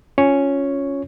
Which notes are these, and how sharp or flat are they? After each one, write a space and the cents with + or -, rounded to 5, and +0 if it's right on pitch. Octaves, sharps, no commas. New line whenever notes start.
C#4 +0 F4 +10 C#5 +0